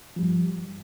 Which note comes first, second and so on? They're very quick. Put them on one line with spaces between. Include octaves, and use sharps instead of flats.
F3 G3 G2